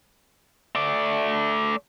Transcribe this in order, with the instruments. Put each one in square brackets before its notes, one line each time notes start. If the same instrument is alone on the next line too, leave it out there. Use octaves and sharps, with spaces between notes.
[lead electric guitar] A3 D5